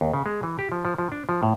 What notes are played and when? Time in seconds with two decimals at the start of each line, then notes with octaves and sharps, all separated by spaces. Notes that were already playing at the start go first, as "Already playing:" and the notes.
0.01 D#2
0.14 C#3
0.26 G#3
0.43 E3
0.59 G4
0.72 F3
0.85 F3
0.98 F3
1.12 D4
1.29 F3
1.43 A2